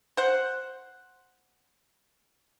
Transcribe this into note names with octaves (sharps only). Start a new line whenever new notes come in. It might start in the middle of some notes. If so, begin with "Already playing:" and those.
C5 F#5